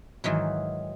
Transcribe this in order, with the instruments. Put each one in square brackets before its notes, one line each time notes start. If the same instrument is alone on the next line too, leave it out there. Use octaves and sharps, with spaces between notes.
[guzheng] G#2 D#3 E3 F#3